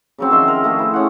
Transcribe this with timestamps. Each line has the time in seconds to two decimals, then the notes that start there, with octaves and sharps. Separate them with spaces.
0.18 C#3 F#3 C4
0.31 D#3 F3 E5 C6
0.48 A#4
0.64 A3 F4 G#4
0.79 E4 C5
0.94 C#4 F#5